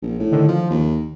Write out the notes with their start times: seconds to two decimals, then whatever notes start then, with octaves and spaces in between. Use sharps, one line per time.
0.02 A#1
0.19 A2
0.32 D3 D#3
0.48 F3
0.71 D#2